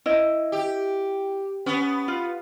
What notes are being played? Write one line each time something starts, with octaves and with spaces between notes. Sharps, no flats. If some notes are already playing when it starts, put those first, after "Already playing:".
E4 D#5
G4
B3 C#4
F4